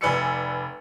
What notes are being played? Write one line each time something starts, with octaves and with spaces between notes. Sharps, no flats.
F1 B4 D5 G#5 E6 C#7